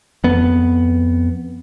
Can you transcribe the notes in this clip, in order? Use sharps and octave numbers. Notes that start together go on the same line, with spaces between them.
F2 B3